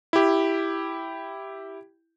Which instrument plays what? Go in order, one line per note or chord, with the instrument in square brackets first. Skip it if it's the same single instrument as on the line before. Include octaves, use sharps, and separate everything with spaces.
[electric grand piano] E4 G4